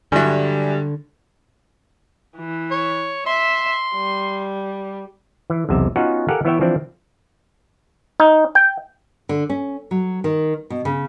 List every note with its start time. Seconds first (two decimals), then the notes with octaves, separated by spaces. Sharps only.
0.12 G2 D3 F#3 G3 E5 G#5
2.37 E3
2.71 C#5
3.26 E5 C6
3.96 G3
5.50 E3
5.69 B1 E2 C3 E5
5.96 B3 C#4 D#4 F4 F#4 F#5
6.29 G4 A4 A#4 F5 F#5 G#5
6.45 E3 B3 E4 C#5 E5 G5
6.61 E3 F3 C4 D4
8.20 D#4
8.55 G5
9.29 D3
9.50 C#4
9.91 F#3
10.24 D#3
10.70 B2
10.85 C#3